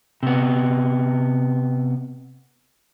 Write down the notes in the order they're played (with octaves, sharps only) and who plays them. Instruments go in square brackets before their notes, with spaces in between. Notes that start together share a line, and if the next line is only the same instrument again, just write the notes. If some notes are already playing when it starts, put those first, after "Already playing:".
[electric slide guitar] C3 B3